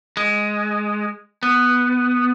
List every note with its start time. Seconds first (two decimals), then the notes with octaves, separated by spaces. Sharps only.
0.17 G#3
1.43 B3